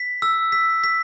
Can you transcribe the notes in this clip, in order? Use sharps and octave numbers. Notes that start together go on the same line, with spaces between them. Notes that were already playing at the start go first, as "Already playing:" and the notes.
Already playing: B6
E6
B6
B6